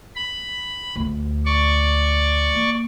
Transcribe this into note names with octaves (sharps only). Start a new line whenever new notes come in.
B5
D2
D5 C#6
A#3